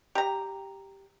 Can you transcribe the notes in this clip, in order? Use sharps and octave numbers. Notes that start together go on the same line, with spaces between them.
G4 A#5